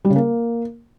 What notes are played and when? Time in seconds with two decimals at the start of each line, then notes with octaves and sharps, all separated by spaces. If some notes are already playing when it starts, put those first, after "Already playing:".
0.05 G3
0.10 C#3
0.16 A#3